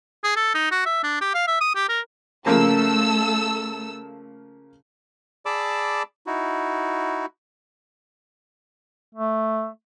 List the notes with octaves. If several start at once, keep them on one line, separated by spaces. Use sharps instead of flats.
G#4
A4
D#4
F#4
E5
D4
G4
F5
E5
D#6
G4
A#4
C#3 F3 A3 A#3 A4 E6
G#4 D5 A5 B5 D6 E6
D#4 E4 F#4
A3